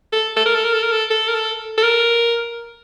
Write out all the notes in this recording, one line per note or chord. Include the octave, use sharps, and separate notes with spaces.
A4
A4
A#4
A4
A#4
A4
A#4
A4
A4
A#4
A4
A4
A#4